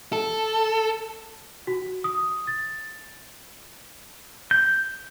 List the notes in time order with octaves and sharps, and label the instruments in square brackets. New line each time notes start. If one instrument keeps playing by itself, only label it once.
[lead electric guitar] A4
[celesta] F#4
D#6
A6
[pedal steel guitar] G6